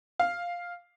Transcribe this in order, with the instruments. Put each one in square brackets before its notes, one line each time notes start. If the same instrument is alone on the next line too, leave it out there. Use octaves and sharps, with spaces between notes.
[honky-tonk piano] F5